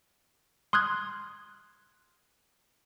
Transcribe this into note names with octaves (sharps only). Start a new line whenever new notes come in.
C6 D#6 F6 F#6 G#6